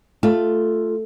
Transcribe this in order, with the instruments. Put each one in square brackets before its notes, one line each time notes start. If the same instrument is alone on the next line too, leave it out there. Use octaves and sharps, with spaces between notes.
[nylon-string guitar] A3 F4